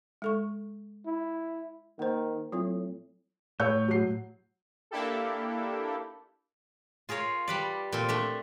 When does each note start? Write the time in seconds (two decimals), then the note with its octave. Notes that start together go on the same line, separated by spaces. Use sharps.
0.22 G#3 A4 C#6
1.06 E4
1.99 D#3 A#3 C5
2.52 A2 F#3 C4 F4
3.60 A2 C#5 E6 G6
3.88 F#3 C7
4.91 A#3 D4 E4 G4 A4
7.09 F4 G#4 A#4 C#5 F5
7.48 G3 B4 D5
7.92 A#2 C4 A4
8.08 A3 D4 E5